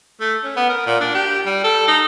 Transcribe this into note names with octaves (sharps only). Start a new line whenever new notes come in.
A3
C#4
B3
A#4
A#2
D4
G4
G3
A4
D#4